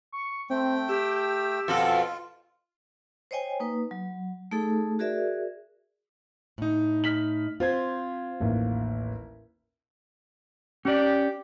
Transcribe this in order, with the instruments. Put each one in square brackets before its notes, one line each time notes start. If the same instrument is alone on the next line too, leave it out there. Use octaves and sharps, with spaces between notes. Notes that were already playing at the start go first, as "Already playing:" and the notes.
[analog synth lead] C#6
[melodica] A3 G5 [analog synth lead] C4
[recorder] G4 [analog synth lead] E6
[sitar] F2 B2 A4 [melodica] F4
[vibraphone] C5 C#5 D#5 G5 G#5
A#3 D#4 B4
F#3
A3 D#4 G#4 A4
F#4 G#4 A#4 D5 E5
[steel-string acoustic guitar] A2 D#4
[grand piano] F6 B6 F#7
[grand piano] C4 G#6 [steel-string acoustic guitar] F4 C5
[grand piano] A1 D#2
[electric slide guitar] C#4 D5 [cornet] G4